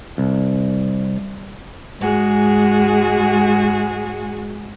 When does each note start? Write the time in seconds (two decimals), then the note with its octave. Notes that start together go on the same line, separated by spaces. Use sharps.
0.18 C2
2.00 G#2 G#3 F#4 G#4